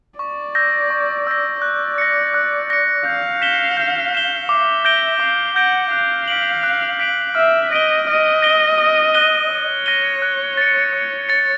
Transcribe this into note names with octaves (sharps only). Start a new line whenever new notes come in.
D5 C#6
E6 G6 A#6
C#6
E6 G6 A#6
D5 F#6
A#6 C#7
F#6
A#6 C#7
F5 G6
B6 E7 G7
G6
B6 E7 G7
E5 D6
G6 A#6 D7 G7
F5 D6
F#5 G6 A#6 D7 G7
F5 F#6
B6 D7 F#7
F#6
B6 D7 F#7
E5 F6
D#5 A#6 D7 G7
D#5 F6
A#6 D7 G7
D#6
F#6 A#6 D#7 G7
C#5 D#6
F#6 A#6 D#7 G7
F#6
A6 C#7
F#6
A6 C#7